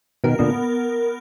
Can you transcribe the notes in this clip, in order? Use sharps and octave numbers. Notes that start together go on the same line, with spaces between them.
B2 D#3 A#4
A#2 D3 B3